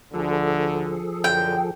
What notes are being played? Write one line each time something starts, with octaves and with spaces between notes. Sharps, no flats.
D2 D3 F3 G#4 A4
F#2 D3 G5